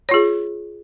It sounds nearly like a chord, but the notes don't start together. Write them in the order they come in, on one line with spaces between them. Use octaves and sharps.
C#5 F4 G#4